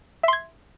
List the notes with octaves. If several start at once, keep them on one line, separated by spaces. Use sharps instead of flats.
E5 C6 G#6